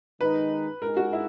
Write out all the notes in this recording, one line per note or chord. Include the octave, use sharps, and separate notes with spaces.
D#3 G#3 D#4 B4
G#3 D#4 G#4 A#4
F#4
E4